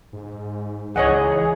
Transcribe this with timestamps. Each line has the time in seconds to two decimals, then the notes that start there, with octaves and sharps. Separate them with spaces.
0.13 G#2
0.96 C#2 E3 G#4 C#5 D#5 F#5